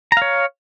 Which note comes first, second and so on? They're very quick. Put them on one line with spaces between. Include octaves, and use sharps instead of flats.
A#5 F5 C#5